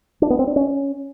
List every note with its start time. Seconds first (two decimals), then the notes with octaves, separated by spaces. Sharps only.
0.22 D4
0.30 B3
0.39 C4
0.47 D4
0.56 C#4